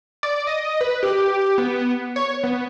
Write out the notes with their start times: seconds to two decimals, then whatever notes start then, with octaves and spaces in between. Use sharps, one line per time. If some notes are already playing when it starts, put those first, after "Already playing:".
0.23 D5
0.47 D#5
0.81 B4
1.03 G4
1.58 B3
2.16 C#5
2.43 B3